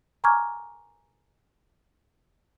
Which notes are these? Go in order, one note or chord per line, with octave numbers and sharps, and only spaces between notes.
G#5 A#5 C#6 D6 F6 G#6